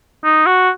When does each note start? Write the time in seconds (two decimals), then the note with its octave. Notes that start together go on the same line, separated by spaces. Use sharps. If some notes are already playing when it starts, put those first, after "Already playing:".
0.24 D#4
0.46 F#4